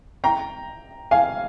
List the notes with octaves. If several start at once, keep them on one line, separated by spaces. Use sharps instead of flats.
G5 A#5
F5 G#5